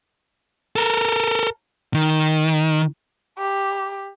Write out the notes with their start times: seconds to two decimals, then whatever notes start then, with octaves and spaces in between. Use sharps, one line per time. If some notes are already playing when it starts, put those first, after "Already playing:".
0.76 A4 A#4
1.94 D#3
3.38 G4